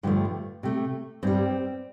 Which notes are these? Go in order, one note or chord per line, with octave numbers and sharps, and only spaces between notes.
G2 D3 F3 A3
C3 A3
G2 G3 C4